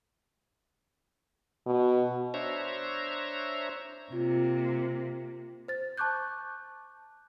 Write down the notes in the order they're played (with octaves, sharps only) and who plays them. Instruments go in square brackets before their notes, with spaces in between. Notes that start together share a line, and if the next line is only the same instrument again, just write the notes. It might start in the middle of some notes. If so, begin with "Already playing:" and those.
[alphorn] B2
[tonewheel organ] D4 C5 C#5 E5 A#5
[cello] C3 A#3 [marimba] F4
[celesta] C5 A6
A5 C#6 D6 F#6 G6